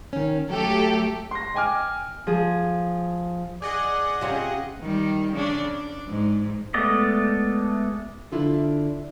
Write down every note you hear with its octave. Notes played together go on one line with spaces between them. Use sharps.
D#3 C#4
F#3 A3 G4 A4
C6 A#6
D#5 G5 G#5 D6 F6
F3 G#4
G#4 D5 D#5 F#5
C3 C#4 F4 G4
D#3 G3
C#3 D4
D4
G#2
G#3 A3 B3 D5 D#5
D3 D4 E4 F4 A4